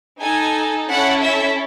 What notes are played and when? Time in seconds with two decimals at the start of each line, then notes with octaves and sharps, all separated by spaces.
0.21 D#4 A4 G#5
0.90 C#4 E4 A4 F#5
1.23 E5